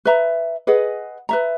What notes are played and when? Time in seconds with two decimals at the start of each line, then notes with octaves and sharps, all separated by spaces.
0.05 B4 E5 A#5
0.67 G#4 B4 D#5 F#5
1.29 B4 E5 A#5